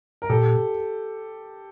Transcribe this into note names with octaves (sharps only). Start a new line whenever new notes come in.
A#4
A#2 G4 A4